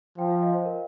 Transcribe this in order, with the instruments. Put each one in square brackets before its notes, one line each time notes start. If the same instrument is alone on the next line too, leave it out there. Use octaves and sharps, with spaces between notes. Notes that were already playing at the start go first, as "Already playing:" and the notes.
[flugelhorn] F3 [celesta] G5
[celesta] F5
D#5
C5
A#4